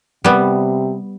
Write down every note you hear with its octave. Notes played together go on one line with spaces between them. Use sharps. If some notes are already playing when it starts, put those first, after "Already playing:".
C3 G3 B3